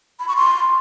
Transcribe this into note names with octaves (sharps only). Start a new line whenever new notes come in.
B5
C#6
C6